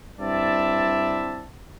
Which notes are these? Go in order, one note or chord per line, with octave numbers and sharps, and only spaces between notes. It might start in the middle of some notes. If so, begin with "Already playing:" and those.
G2 C4 E4 D5 E5 A5